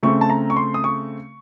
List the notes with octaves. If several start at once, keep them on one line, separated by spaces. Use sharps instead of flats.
C#3 A3 C4 C#6
A5
A#5
C#6
C6
D#6
C#6